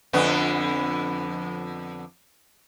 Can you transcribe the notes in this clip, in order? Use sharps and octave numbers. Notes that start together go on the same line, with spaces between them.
F2 D3 B3